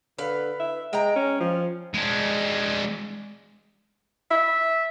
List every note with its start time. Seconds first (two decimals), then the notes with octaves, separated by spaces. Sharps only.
0.18 D3 B4 F5
0.60 E5
0.93 G#3 G5 A#5
1.16 C#4
1.40 F3
1.94 G#3 D4
4.31 E5